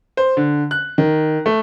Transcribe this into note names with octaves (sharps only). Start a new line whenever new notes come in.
C5
D3
F#6
D#3
A3